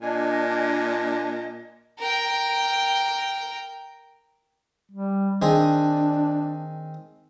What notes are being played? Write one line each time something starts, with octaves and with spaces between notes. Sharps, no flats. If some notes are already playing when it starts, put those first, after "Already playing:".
A#2 D4 D#5 G#5
A#4 G5
G3
D#3 C4 D4 G#4